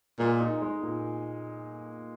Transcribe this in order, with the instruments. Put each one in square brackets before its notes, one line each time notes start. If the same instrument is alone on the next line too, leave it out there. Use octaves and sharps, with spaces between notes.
[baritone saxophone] A#2 [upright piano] G#3
[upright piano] D#4
G#3
A#2